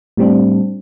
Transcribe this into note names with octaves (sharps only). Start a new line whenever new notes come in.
A2 G3 C4 D4